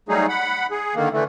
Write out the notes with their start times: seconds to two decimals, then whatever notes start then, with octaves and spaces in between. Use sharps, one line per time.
0.09 F#3 G3 A3 D#4 G#4
0.29 F#5 B5
0.71 G#4
0.95 D3 D#3 A#3
1.12 D3 E3 A3